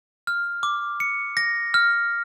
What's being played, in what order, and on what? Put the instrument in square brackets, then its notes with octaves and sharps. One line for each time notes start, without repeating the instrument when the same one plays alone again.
[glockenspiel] F6
D6
C#7
A#6
F6